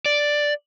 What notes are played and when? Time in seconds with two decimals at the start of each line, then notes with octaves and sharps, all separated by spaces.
0.06 D5